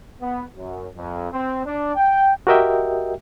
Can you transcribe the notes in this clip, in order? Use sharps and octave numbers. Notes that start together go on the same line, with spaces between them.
B3
F#2
F2
C4
D4
G5
F#4 G4 A#4 D#5 E5 G5